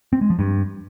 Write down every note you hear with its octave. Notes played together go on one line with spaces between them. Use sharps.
C4
G#3
F3
G2